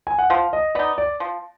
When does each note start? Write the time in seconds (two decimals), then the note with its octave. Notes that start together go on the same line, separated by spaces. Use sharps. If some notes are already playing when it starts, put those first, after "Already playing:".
0.07 G#5
0.18 F#5
0.30 F3 F5
0.53 D#5
0.75 B3 D#4 D5
0.98 D5
1.20 F3